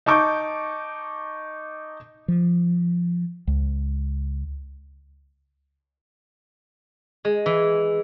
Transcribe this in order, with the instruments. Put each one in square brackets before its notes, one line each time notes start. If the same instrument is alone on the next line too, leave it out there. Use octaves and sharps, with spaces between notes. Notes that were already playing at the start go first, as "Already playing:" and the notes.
[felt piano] D#4 A5 C#6 D6 G6
[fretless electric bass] F3
C#2
[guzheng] G#3
E3